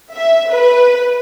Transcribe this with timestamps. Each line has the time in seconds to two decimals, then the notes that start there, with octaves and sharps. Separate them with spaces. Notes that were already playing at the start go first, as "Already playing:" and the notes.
0.15 E5
0.52 B4